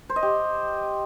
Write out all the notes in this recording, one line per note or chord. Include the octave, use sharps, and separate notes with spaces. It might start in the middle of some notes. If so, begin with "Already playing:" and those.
C5
D#5
G4